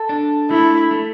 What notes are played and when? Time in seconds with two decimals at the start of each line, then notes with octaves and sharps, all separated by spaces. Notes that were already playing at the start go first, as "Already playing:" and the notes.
Already playing: A4
0.09 D4
0.50 A3 E4
0.91 A3